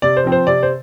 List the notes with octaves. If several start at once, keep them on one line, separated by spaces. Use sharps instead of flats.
C3 D5
C5
F3 C4
C5
C3 D5
C5